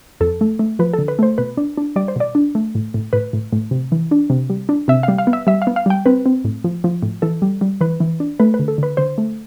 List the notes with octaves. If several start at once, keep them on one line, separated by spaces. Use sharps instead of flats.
F2 A4
A3
A3
F3 B4
D3 A4
B4
A3 C5
B2 B4
D4
D4
G3 D5
C5
B2 D5
D4
A3
A2
A2
A2 B4
A2
A2
C3
E3
D4
C3
G3
D4
C3 E5
F5
G3
F5
B3
E5
G3 E5
F5
B3
F5
G3 G5
C4 B4
C4
A2
F3
F3
A2
E3 A4
G3
G3
E3 B4
E3
D4
A3 B4
B4
D3
A4
D3 B4
D3 C5
A3